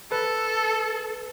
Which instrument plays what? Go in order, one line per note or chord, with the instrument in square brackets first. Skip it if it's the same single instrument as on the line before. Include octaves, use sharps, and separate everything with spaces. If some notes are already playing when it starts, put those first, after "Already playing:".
[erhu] A4 [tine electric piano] B4